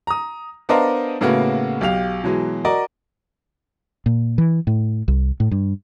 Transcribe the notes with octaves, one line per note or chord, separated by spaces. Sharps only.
A#5 D#6
B3 D4 A#4 C5 D#5 F5
A2 C#3 A#3 B3 F#4
B1 G4 F5 F7
B2 E3 F#3 G#3
F#4 A#4 D5 D#5
A#2
E3
A2
C2
A2
G2